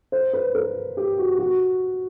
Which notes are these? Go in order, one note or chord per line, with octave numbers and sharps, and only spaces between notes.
C5
B4
A#4
G4
F#4
F#4